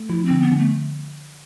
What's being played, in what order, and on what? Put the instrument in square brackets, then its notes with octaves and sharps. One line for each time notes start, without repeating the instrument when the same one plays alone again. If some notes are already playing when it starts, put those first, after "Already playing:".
Already playing: [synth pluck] A3
[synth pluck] F3 [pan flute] E4
[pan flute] C4
[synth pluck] D3
[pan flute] B3
[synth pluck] D3
[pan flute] A3